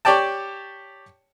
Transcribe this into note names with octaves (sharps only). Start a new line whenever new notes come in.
G4 C#5 D5 G5 A5